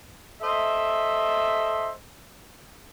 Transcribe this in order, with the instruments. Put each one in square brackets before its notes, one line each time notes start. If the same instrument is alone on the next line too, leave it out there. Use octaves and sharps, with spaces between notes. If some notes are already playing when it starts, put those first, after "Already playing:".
[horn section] A4 C5 D#5 E5